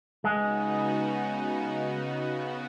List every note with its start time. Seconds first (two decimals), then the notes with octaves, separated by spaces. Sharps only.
0.24 C#3 G#3 B3 D#4 F#4
2.14 C#3 B3 F#4